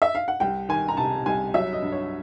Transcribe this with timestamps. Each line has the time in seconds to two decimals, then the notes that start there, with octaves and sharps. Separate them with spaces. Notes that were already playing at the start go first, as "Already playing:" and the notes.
0.02 E5
0.15 F5
0.28 F#5
0.40 C2 G5
0.69 D#3 G#5
0.88 A#5
0.97 C3 A5
1.26 C2 G#5
1.54 F#3 E5
1.73 D#5
1.83 G2
1.92 C#5